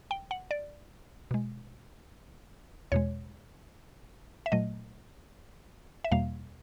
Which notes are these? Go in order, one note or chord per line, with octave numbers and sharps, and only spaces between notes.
G5
F#5
D5
B2 G#3
E2 B2 G#3 C#5
E5
A#2 F#3 A3 D#5
E5
E2 B2 G3 A#3 F5